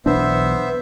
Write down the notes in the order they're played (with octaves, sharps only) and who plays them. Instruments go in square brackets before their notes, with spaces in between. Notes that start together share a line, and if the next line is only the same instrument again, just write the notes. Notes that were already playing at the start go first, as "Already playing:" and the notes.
[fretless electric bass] B1 E2 D4 [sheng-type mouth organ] B3 C5 E5